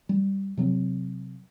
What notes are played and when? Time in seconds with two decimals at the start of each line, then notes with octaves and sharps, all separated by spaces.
0.09 G3
0.57 C3 F#3 C4